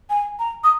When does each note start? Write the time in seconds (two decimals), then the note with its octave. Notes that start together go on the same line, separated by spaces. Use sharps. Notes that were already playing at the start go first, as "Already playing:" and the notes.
0.10 G#5
0.39 A#5
0.64 D#6